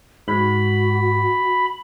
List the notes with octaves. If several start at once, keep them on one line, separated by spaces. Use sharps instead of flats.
G#2 F#4 B5